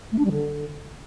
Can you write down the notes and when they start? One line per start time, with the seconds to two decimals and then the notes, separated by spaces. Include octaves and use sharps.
0.12 A3
0.18 D4
0.25 G3
0.32 D3